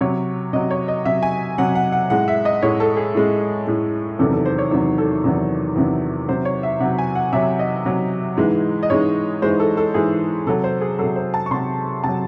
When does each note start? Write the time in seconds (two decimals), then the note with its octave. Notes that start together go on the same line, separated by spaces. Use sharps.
0.01 C3 F#3 C#5
0.53 C3 F#3 D#5
0.71 C#5
0.88 D#5
1.05 C3 F#3 E5
1.23 G#5
1.58 C3 F#3 F#5
1.75 F#5
1.92 F#5
2.10 A2 G#3 F#5
2.28 E5
2.45 D#5
2.62 A2 G#3 C#5
2.80 A4
2.97 G#4
3.15 A2 G#3
3.67 A2 G#3
4.19 E2 C3 D#3 F#3 A4
4.33 A4
4.46 C5
4.58 C#5
4.71 E2 C3 D#3 F#3 C5
4.98 A4
5.24 E2 C3 D#3 F#3
5.76 E2 C3 D#3 F#3
6.28 C3 F#3 C5
6.45 C#5
6.63 E5
6.80 C3 F#3 F#5
6.98 G#5
7.15 F#5
7.33 C3 F#3 E5
7.59 D#5
7.85 C3 F#3
8.37 G#2 E3 G#3
8.83 D#5
8.90 G#2 E3 G#3 C#5
9.42 G#2 E3 G#3 C5
9.60 A4
9.77 A4
9.94 G#2 E3 G#3 G#4
10.46 C3 F#3 A4
10.64 C5
10.81 G#4
10.99 C3 F#3 A4
11.16 C5
11.34 A5
11.46 C#6
11.51 C3 F#3 C6
12.04 C3 F#3 A5